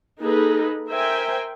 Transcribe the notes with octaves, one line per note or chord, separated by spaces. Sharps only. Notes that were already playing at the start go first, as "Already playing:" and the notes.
A#3 D#4 G#4 A4 B4
A#4 C5 E5 G5 G#5